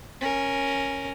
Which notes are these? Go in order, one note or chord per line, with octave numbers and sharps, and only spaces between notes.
C#4 A#4